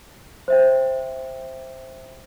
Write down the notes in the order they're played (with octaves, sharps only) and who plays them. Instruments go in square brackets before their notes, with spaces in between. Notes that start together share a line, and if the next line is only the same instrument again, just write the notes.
[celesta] C5 E5 G5